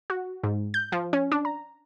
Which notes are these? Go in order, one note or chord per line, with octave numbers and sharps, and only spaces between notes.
F#4
G#2
G6
F3
C#4
D4
A#5